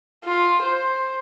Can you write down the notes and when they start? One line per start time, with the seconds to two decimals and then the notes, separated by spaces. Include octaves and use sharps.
0.24 F4
0.62 C5